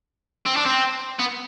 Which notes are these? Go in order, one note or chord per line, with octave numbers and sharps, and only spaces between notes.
C4
D4
C4
B3